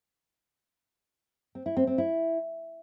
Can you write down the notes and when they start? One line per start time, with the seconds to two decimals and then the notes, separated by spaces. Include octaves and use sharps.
1.55 C4
1.66 E4
1.77 C4
1.87 C4
1.98 E4